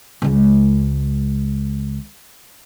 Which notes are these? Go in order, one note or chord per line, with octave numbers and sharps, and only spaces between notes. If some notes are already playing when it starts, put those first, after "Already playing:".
C#2 G#3